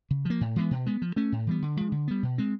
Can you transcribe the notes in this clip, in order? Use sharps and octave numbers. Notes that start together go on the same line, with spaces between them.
C#3
F3 A#3
A2
E3 G#3 B3
B2
G#3 B3
F3
A3 C#4
A2
E3 G3 B3
D3
F3 G#3
D3
G3 B3
B2
G#3 C4